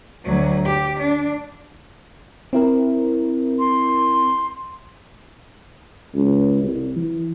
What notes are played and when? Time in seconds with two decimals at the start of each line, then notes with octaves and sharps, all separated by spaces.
0.24 D2 F#3
0.65 G4
0.99 D4
2.53 C4 E4 A#4
3.59 C6
6.15 C#2
6.64 C2
6.96 E3